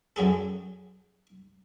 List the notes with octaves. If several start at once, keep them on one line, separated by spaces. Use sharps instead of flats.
F#2 F#3 G#4 A4